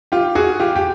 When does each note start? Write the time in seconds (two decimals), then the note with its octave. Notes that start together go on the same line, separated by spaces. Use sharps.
0.12 F4 G4
0.35 F#4 G#4
0.60 F4 G4
0.76 G4